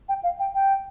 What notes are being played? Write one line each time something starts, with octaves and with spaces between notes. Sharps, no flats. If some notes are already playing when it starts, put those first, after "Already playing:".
G5
F5
G5
G5